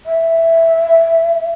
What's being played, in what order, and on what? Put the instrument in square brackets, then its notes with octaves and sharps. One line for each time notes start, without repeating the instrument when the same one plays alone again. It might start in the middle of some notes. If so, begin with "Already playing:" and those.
[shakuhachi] E5